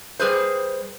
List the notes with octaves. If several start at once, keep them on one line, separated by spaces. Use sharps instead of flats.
G3 G#4 B4 C5